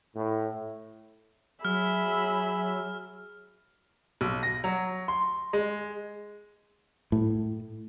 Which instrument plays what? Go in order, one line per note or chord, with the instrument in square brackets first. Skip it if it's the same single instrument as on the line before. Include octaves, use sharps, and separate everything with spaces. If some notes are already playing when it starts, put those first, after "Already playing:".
[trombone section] A2
[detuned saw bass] F#3 [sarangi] G#4 [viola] E5 B5 [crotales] F6
[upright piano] B1
A#6
F#3
C6
G#3
[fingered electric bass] A2